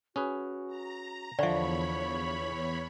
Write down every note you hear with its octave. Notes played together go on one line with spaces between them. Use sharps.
C#4 F#4 G#4 B4
A#5
E2 D3 F3 C#5 D5 E5 B5 C#6